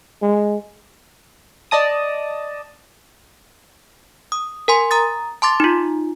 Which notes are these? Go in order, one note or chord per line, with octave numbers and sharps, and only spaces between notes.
G#3
D5 D#5 A5 D#6
D#6
A#4 G#5 C6
A#5 D#6 A6
A5 C6 D6 A6
D#4 F4